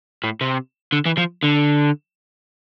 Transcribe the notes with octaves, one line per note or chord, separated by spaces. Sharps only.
A2
C3
D3
E3
F3
D3